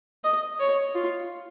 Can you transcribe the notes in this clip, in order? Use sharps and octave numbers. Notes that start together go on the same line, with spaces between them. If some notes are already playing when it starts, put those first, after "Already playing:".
D#5
C#5
F4